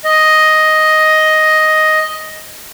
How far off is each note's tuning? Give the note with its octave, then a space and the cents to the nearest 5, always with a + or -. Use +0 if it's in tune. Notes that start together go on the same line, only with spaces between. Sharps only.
D#5 +5